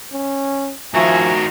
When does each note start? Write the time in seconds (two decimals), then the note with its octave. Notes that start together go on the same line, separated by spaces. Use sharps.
0.13 C#4
0.94 D#3 F3 F#4 E5 G#5 A#5